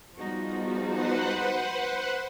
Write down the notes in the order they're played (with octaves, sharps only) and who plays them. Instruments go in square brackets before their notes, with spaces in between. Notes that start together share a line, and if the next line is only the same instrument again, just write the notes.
[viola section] F3 B3 G#4 [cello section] G3 D#4 F#4
[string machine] B4 C5 F#5